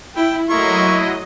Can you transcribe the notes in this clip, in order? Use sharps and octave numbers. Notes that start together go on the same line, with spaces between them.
E4 G5
F#3 A3 A#3 E4 D#5 A#5 C6 C#6